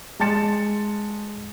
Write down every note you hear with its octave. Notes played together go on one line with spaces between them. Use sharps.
G#3 A5 C6 A6 C#7 E7